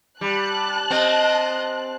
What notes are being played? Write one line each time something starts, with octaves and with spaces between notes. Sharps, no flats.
G3 A5 F#6
C4 D#5